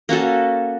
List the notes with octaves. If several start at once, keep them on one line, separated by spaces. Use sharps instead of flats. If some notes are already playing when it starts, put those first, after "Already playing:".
A#3 C#4 F#4 A4